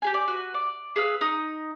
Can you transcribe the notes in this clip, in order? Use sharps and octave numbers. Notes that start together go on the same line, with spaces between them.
G4 G#4 G#5
D5
F#4 B4
D5
G#4 B4 F5 E6
D#4 D#6